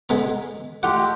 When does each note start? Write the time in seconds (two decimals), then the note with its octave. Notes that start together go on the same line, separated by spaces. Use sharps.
0.09 G#3 B3 A#5
0.83 G#3 A3 F4 G4 F#5